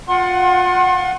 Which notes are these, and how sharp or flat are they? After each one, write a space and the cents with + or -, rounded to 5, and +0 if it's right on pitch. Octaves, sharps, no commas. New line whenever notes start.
F4 +30 F#5 +10 C6 +45